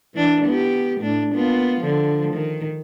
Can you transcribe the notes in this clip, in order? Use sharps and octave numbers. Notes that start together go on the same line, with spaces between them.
E3 D4
B3 G4
A2 D4
A#3 B3 F4
D3 F3
D#3